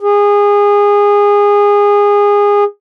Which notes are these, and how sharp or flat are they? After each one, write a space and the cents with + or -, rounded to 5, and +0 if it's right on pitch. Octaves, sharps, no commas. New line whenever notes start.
G#4 -25